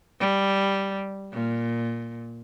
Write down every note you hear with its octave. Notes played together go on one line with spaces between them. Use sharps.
G3
A#2